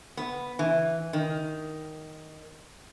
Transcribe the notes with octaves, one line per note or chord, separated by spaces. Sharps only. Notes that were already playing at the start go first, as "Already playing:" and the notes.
B3
E3
D#3